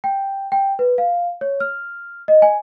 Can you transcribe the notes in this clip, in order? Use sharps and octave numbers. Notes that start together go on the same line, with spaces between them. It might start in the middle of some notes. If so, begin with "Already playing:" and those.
G5
G5
B4
F5
C#5
F6
D#5
G#5